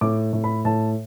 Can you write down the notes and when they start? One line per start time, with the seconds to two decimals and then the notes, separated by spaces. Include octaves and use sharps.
0.01 A2 D6
0.33 A2
0.44 B5
0.65 A2 A5